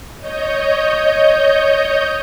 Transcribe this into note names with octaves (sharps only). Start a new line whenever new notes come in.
C#5 D#5 G6